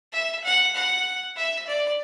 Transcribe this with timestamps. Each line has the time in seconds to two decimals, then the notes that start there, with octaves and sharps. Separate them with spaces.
0.13 E5
0.44 F#5
0.75 F#5
1.36 E5
1.67 D5